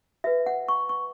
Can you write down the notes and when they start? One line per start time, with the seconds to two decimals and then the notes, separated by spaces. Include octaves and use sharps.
0.24 F#4 B4 E5
0.46 F#5
0.68 C#6
0.89 C#6